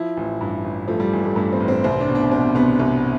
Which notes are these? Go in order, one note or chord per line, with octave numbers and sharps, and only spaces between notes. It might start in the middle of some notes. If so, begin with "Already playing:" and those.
Already playing: F3 E4
A1
G2
A1
F3 A3
G3
A1
A3
G2 A3
C4
A1
C4
C2 C4
D4
B2
D4
B2 C4
C2 B3
C2